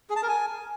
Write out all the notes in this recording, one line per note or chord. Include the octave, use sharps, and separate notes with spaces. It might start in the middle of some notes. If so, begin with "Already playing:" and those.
G#4
A5
A#4
G#5